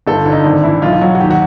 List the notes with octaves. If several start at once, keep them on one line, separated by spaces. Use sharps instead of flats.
G1 A4
D3
D#4
G#1 D4
E3 E4
B1 F4
F4
F#3 F#4
F#4
D#2 G4
F#4